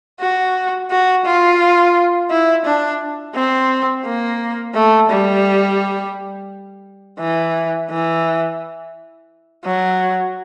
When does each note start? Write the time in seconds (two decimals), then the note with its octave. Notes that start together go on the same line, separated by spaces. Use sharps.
0.20 F#4
0.91 F#4
1.26 F4
2.31 E4
2.66 D4
3.35 C4
4.05 A#3
4.75 A3
5.10 G3
7.20 E3
7.90 E3
9.65 F#3